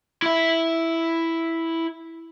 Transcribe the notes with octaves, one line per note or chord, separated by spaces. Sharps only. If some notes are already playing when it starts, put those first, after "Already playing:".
E4 E5